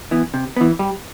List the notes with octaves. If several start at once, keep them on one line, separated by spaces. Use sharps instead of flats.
E3 B3
C3
E3 B3
G3